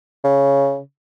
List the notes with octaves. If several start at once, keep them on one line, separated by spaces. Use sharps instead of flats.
C#3